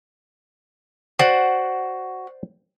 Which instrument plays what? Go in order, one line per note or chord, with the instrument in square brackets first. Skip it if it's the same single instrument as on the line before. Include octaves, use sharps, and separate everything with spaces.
[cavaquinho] F#4 [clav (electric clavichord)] C5 D5 F#5